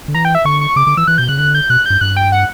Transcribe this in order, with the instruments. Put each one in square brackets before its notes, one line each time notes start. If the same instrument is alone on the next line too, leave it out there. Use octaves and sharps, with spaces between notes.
[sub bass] D3
[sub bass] E3 [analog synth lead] A#5
[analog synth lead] G5
E5
[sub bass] D3 [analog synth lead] C#6
[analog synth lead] C#6
[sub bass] C#3 [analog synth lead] D6
[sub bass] D3 [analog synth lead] D6
[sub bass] E3 [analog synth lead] E6
[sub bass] E3 [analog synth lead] F#6
[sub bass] B2 [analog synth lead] G6
[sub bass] C#3 [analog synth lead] F#6
[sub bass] D3 [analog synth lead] F#6
[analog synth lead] G6
[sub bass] B2 [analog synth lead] F#6
[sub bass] G2 [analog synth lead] G6
[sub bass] G2 [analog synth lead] F#6
[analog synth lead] G5
F#5